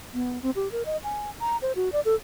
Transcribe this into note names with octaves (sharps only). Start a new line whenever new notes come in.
B3
C4
G4
A#4
D#5
G#5
A#5
C5
F#4
D5
A4